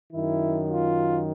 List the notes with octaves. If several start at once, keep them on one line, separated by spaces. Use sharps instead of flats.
F#2 D#3 E4
F4